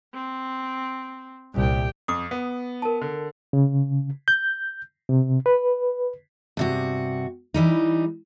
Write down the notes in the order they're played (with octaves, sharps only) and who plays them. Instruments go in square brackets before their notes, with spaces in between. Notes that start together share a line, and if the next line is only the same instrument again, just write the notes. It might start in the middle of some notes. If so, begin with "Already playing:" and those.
[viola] C4
[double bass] C2 A#2 [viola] G4 G5
[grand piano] F2 [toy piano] D6 D#6
[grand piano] B3
[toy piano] A#4 A5
[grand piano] D3
[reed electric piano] C#3
G6
C3
B4
[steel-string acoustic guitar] G2 C3 F#4
E3 G3 D#4